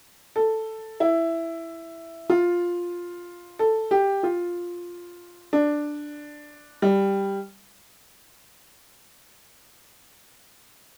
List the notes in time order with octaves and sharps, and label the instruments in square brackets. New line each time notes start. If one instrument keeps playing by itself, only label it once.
[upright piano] A4
E4
F4
A4
G4
F4
D4
G3